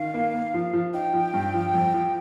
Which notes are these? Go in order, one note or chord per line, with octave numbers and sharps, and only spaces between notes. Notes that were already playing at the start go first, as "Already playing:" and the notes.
Already playing: D#3 F5
A#3
A#3
F3
F3
D#4 G5
F3
G2
F3
F2
F3